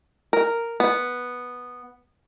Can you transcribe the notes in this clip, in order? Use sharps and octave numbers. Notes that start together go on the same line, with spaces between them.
A#4
B3